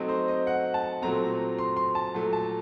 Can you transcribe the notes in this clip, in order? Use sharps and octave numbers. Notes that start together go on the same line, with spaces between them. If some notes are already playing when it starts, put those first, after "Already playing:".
Already playing: F#3 A3 C4 D#4
C5
D#5
F#5
A5
A#2 F#3 A3 C4 A#5
C6
C6
A5
A#2 F#3 A3
A5